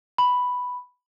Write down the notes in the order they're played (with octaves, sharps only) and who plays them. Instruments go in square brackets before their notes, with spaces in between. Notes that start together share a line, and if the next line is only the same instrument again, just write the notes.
[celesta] B5